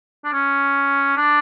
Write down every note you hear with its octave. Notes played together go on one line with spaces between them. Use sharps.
D4
C#4
D4